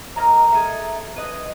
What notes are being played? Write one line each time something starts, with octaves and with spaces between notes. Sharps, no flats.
A#4 D5 D#5 A#5
A3 G#4
B4 D#5